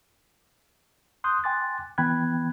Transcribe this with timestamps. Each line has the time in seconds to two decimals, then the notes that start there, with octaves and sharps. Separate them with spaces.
1.24 C6 D#6 F#6 G6
1.44 G5 G#5 C6 D6 F#6 A6
1.98 E3 B3 G5 B5 F#6 G#6